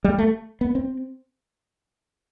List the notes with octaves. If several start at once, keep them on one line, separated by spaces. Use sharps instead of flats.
G3
A3
B3
C4